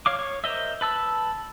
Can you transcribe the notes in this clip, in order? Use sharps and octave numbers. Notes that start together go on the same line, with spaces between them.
C#5 F5 D6
C#5
A#4 C5 D#5 E5
B4 A5 E6